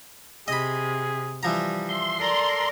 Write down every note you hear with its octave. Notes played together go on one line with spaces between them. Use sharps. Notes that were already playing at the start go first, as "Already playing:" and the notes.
C3 G#4 D#5 B5
E3 F3 G3 A#5
E5 C6
A4 A#4 D5